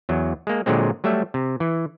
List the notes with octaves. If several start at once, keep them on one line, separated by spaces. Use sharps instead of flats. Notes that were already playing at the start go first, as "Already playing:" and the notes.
E2 F#3
G#3 A#3
A#2 D3 F#3 G#3 C4
F#3 G3 A3 E5
C3
E3